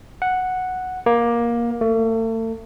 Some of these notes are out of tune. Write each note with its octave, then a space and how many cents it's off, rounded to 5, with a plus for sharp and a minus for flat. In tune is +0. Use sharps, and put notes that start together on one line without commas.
F#5 -5
A#3 +15
A3 +40